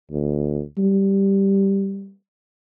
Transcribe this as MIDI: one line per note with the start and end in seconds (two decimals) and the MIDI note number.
0.12 0.63 38
0.78 2.12 55